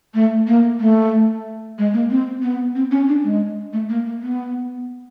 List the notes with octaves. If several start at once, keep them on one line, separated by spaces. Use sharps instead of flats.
A3
A#3
A3
G#3
A#3
C4
B3
C4
C#4
D4
G#3
A3
A#3
A#3
B3